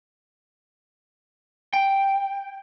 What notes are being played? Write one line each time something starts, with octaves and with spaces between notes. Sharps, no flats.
G5